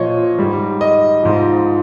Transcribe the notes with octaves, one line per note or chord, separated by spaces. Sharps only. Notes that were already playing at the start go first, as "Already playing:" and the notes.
Already playing: A#2 F3 C#5 D#5
G#2 G3
D#5
G#2 F3